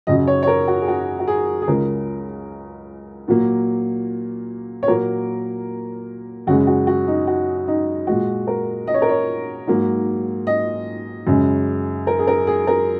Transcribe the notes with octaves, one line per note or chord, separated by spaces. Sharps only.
F#2 C#3 F#3 D#5
C#5
C#5
A#4
F#4
G#4
F#4
F#4
G#4
G#4
C#2 C#3 G#3 A#4
A#2 F#3 A#3
C#5
A#2 F#3 A#3 A#4
F#2 C#3 G#3 F#4
F#4
F#4
D#4
F#4
D#4
A#2 G#3 F#4
A#4
D#5
C#5
A#4
C#5
G#2 F#3 A#3
D#5
F#2 C#3 G#3
A#4
G#4
A#4
G#4
A#4